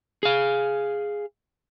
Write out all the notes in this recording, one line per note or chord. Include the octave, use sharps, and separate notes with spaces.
G#4 F5